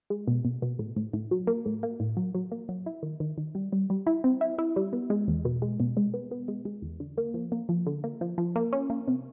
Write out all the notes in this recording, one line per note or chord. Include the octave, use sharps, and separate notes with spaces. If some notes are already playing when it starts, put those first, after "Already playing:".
G#3
B2
B2
B2
A2
A2
A2
F#3
A#3
A2
A#3
A2
F#3
F#3
A#3
F#3
E4
D#3
D#3
D#3
G3
G3
G3
E4
C4
E4
E4
G3
B3
G#3
E2
B2
G#3
B2
G#3
B3
B3
G#3
G#3
E2
D3
A#3
F3
A#3
F3
D3
A#3
F3
F3
A#3
C#4
A#3
C3